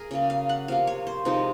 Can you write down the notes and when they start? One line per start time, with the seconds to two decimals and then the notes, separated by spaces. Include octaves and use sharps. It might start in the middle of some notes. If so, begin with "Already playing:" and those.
Already playing: G#4 A#4
0.11 C#3 F#3 A#3
0.30 F5
0.49 F#5
0.68 C3 F3 A#3 F5
0.87 C#5
1.07 C5
1.25 C3 F3 G#3 D#4